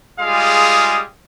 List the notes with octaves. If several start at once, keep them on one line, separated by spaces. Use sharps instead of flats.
G3 G#3 F4 G#4 F5 D#6